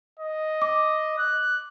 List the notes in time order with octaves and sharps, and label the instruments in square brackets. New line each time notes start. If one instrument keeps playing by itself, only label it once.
[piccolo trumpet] D#5
[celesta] D6
[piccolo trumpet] F#6